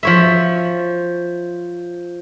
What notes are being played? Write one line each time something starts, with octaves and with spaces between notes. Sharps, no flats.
F3 C#5 E5